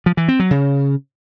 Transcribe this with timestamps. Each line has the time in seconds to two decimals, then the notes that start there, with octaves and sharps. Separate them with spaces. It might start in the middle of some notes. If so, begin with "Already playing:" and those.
0.06 F3
0.17 E3
0.28 C4
0.40 F#3
0.51 C#3